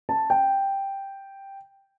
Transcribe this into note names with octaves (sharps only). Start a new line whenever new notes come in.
A5
G5